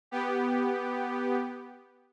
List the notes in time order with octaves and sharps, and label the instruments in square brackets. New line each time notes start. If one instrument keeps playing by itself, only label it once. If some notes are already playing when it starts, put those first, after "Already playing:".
[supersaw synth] B3 G4